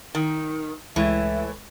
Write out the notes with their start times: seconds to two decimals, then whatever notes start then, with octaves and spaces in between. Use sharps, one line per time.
0.15 D#3 D#4
0.96 C#2 A2 E3 G#3 E5 A6